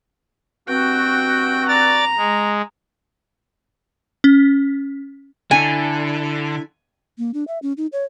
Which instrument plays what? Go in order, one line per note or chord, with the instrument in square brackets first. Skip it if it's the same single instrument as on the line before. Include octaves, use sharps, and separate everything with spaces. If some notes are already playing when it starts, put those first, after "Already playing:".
[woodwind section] G2 C4 F#4 [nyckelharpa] G5
[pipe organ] D5 A6 [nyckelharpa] A#5
[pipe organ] G#3
[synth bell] C#4
[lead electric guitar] D3 [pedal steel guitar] D4 E4 A4 [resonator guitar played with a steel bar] G#5
[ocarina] A#3
D4
E5
C#4
D#4
C#5